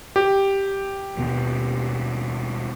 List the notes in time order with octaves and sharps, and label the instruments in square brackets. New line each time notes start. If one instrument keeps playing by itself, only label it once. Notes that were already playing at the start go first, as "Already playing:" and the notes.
[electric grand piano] G4
[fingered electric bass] D#2 B2 B3